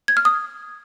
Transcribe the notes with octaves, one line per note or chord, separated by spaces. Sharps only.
G#6
F6
D#6